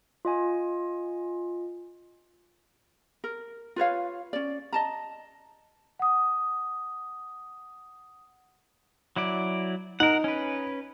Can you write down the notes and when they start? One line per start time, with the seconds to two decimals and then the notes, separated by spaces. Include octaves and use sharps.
0.25 F4 D#5 G#5
3.24 A#4
3.76 F4 B4 C#5 F5
4.33 C#4 D5
4.73 D#5 A5 A#5
5.99 F#5 D#6
9.16 F#3 E4 D5
10.00 D#4 A#4 F#5
10.24 C#4 B4